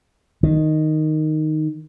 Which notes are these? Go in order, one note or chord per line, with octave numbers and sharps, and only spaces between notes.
D#3